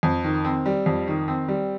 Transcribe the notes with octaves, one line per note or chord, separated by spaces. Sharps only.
F2
D#3
C4
G3
F2
D#3
C4
G3